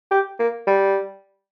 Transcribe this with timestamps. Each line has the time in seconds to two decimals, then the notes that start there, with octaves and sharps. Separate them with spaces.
0.11 G4
0.39 A#3
0.67 G3